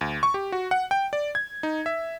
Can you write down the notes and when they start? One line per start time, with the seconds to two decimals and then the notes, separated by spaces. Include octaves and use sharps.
0.01 D2
0.23 C#6
0.34 G4
0.52 F#4
0.71 F#5
0.91 G5
1.13 D5
1.35 G#6
1.63 D#4
1.86 E5